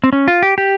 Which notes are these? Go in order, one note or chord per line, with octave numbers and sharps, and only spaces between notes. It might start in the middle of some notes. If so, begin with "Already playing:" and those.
C4
C#4
F4
G4
G4